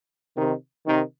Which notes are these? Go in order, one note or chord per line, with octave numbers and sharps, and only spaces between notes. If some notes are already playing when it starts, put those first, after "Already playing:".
C3 D#3
C3 D#3